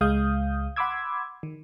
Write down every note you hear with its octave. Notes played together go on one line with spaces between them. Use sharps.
C#2 G#3 F5 D#6 G6
F#5 B5 C6 D6 E6 G#6
D#3